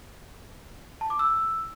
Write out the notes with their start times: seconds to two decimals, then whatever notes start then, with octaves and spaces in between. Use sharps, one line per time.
1.01 A5
1.10 D6
1.19 E6